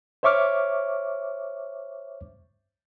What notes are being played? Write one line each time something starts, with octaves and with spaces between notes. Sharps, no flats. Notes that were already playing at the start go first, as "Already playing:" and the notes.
C5 C#5 E5 C#6 D6 F6